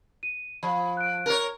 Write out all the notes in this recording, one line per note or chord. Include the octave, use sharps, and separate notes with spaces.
D#7
F3 B5
F#6 D7
A#4 C#5